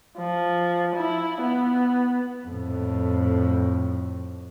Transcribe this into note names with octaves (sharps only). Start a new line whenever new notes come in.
F3
E4
B3
F2 A2